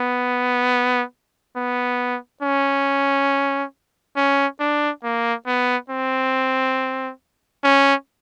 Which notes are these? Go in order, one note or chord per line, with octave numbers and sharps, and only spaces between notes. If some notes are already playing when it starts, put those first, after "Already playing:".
Already playing: B3
B3
C#4
C#4
D4
A#3
B3
C4
C#4